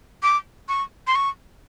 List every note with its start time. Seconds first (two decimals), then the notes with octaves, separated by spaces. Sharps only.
0.23 D6
0.68 C#6
1.07 C6
1.15 C#6